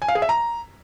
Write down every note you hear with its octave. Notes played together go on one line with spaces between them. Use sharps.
G#5
F5
G#4
E5
A#5